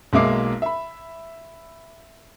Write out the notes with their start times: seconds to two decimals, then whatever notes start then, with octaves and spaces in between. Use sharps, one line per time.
0.13 B1 G#3 A#3 E5 D6 C7
0.62 E5 B5